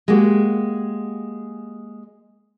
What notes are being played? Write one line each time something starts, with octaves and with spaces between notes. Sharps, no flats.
G#3 A#3 F#4 G4